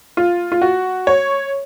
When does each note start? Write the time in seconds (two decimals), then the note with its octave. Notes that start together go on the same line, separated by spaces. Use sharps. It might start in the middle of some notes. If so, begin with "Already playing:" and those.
0.17 F4
0.52 F4
0.62 F#4
1.07 C#5